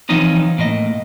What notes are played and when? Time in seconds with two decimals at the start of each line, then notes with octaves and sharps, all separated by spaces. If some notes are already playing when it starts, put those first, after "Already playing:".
0.09 E3 F3 C4 C#4 D#4 F4
0.58 A2 A#3 D#5